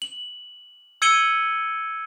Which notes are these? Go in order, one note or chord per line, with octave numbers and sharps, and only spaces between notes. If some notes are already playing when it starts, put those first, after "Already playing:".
F#7
E6 G#6 C#7 D#7 F#7 G7